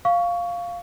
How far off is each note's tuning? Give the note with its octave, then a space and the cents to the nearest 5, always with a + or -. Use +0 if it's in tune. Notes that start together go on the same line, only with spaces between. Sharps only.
F5 +0 C#6 +15